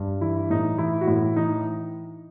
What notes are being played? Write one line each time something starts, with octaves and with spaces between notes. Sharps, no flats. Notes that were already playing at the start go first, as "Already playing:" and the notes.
Already playing: G2
E3 E4
A2 D#4
E3 E4
F#4
A2 E4
E3 D#4